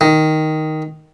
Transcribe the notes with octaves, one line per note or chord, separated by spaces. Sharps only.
D#3